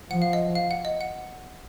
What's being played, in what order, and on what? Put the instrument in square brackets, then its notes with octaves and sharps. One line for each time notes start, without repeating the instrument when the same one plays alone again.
[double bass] F3 [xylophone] F#5
[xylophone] F5
D#5
F5
F#5
D#5
F#5